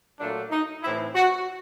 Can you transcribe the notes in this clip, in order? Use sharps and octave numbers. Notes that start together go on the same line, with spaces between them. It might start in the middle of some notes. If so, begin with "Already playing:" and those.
A#2 F#3 A3 D4
D#4
A2 E3 A3 C4 E4
F#4